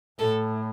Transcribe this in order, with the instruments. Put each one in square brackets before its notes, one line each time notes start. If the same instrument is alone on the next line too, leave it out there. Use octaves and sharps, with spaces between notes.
[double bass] A2 [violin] A4